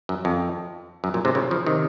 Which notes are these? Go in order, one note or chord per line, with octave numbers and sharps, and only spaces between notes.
F#2
F2
F#2
F#2 A#2
G#2 C3
A#2 C#3
C#3 F3
C3 D#3